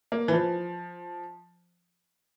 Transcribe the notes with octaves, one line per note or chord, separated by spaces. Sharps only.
A#3
E3
F3